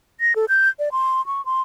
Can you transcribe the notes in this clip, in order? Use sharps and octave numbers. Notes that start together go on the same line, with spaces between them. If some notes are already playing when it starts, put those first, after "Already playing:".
A#6
A4
G6
D5
C6
C#6
C6